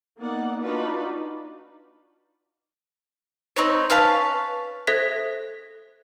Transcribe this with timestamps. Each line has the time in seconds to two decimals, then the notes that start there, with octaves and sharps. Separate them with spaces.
0.18 A#3 B3 D#4 D5 F#5
0.61 D4 D#4 F4 F#4 B4 D5
3.56 C4 D#4 B4 C#5
3.90 C#4 B4 F5 A5
4.87 A4 C5 E5 F#6 G#6 B6